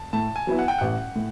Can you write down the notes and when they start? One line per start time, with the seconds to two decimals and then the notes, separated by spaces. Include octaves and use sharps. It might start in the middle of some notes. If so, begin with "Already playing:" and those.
Already playing: A5
0.13 A2 A5
0.36 G#5
0.47 F#3 B3 E4
0.59 F#5
0.68 G5
0.78 A1 F#5
1.16 A2